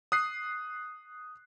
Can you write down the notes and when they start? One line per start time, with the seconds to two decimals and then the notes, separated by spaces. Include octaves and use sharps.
0.12 D#6 F#6 C7